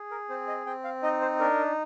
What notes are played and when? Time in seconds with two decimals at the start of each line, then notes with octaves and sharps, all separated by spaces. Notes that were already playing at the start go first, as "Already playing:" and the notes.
Already playing: G#4
0.11 A#4
0.29 C4 C5
0.48 D#5
0.66 C4 G5
0.84 F5
1.03 D#4 D#5
1.21 C5
1.40 D4 A#4